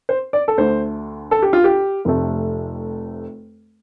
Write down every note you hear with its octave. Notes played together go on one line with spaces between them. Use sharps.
C5
D5
A4
D2 D3 A3 C5
A4
G4
F4
G4
F1 F2 C3 A3